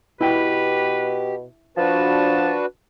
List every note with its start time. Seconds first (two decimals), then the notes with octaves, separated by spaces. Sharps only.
0.21 B2 E4 G4 B4 G5
1.77 F3 D4 F#4 B4 A5